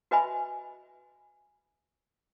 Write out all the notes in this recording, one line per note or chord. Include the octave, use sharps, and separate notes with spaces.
F#4 B4 D#5 E5 G#5 B5